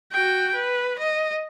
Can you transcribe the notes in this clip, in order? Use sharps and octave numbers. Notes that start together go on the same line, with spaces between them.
F#4 G5
B4
D#5